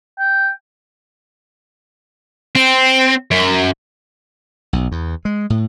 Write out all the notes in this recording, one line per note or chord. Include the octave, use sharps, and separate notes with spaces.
G5
C4
F#2
B1
E2
G#3
A2